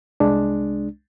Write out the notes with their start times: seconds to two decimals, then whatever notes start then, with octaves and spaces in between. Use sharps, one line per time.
0.20 C2 G#3 D4